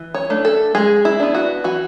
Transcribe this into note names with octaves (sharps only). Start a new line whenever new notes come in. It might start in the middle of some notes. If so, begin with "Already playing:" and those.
Already playing: E3
C#5
A3 D4
A4
G#3 G#4
E4
B3 D4
F#4
E3 F#4